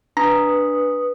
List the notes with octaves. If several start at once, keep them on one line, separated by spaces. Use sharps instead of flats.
D4 B4 A#5 D#6